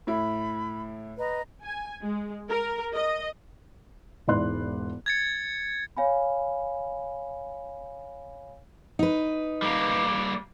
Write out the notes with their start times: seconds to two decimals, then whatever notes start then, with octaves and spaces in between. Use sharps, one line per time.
0.07 A2 E4 B5
1.18 B4 D#5 A#5
1.63 G#5
2.02 G#3
2.50 A#4
2.94 D#5
4.28 E1 G#2 E4 D5 C6 F#6
5.06 G#6 A6 C#7
5.97 C#5 F5 G#5 B5
8.99 D#4 B4
9.62 G3 A#3